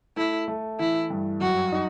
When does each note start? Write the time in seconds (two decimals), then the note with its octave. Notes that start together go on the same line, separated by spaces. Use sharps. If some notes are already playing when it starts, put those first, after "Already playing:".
0.17 A3 E4
0.48 A3
0.79 E3 E4
1.10 G2
1.41 F#2 F#4
1.72 D#4